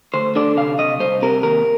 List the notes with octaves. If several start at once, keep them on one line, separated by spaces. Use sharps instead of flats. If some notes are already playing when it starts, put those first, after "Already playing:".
D2 C5
D3 D5
C3 F5
C3 D#5
C2 C5
C3 A#4
D#2 A#4